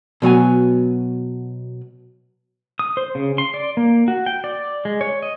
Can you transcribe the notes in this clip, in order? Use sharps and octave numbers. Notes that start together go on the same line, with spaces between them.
B2 F#3 B3 G#5
D#6
C5
C#3
C6
D5
A#3
F#4
G5
D5
G#3
C#5
D#5